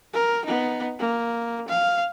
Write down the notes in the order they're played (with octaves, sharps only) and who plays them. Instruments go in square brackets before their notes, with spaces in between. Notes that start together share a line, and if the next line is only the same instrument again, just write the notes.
[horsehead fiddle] A#4
B3 D#4
A#3
F5